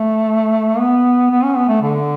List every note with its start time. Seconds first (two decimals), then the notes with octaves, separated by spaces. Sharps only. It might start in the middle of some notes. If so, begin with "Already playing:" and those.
Already playing: A3
0.78 B3
1.31 B3
1.44 C#4
1.56 B3
1.69 A3
1.82 D3